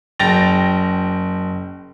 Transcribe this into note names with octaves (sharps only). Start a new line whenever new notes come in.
F#1 G5 A6 A#6 F7